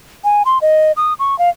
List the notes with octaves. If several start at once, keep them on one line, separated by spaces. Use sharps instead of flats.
G#5
C6
D#5
D#6
C#6
F5